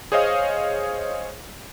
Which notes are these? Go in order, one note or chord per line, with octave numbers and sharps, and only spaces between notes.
G#4 C5 C#5 D#5 F5 D#6